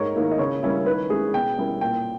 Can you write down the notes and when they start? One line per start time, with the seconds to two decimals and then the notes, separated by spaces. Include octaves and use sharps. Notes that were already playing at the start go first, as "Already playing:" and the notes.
Already playing: G#2 A#4 C#5
0.16 D#3 A#3 E4
0.32 D#5
0.38 C#3 C#5
0.63 G3 A#3 C#4 E4
0.86 D#3 B4
1.09 G#3 C#4 E4 G#4
1.34 B2 G5
1.57 G3 C#4 E4 A#4
1.81 A#2 G5